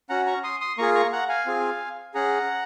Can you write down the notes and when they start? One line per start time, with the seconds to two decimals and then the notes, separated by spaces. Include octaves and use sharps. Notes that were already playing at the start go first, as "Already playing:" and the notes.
0.10 C#4 F#4 F#5 A#5
0.26 A#5 C#6
0.44 C6 D#6
0.61 C6 D#6
0.78 A#3 F4 G#4 A#5 C#6
0.95 A#5 C#6
1.12 F#5 A#5
1.29 F5 G#5
1.46 C4 F4 G#4
2.14 C#4 G#4 F#5 A#5